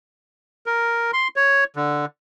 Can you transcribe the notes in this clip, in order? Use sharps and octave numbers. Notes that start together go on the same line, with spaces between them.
A#4
C6
C#5
D3